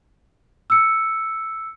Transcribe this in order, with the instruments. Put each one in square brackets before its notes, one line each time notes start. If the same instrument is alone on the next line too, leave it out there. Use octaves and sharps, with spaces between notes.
[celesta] E6 C#7